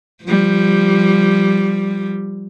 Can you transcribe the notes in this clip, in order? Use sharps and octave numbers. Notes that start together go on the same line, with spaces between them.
F3 G3